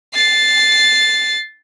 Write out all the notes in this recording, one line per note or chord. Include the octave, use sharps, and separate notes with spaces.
A6 C7